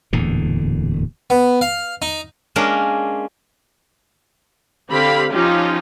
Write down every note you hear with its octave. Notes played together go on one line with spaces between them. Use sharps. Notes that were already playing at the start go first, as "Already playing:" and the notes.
D1 E2 A#2 D3
B3
F5
D#4
G#3 A#3 C#4 D4 A#4
D3 C4 G4 F5 B5
F3 C#4 D#4 F4 G4